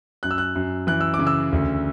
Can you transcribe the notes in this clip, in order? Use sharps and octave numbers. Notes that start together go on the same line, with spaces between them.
F#2 F#6
E6
F#6
F#2
E3 F#6
E6
D6
C#3
E6
D2